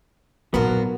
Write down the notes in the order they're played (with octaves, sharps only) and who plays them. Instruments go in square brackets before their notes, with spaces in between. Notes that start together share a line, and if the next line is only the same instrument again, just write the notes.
[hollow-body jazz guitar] B1 B3 [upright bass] A#2 D#3 [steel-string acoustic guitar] F#3 F4 F#4 [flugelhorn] A#4